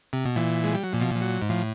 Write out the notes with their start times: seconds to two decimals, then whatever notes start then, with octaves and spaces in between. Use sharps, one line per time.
0.13 C3
0.25 B2
0.36 A#2 E3
0.64 G#3
0.74 G3
0.83 F#3
0.93 A#2 F3
1.01 B2
1.10 A#2
1.15 F3
1.21 F#3
1.42 G#2
1.49 A2 F3